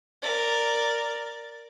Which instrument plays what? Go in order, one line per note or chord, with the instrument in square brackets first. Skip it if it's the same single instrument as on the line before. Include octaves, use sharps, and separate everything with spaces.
[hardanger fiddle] A#4 D5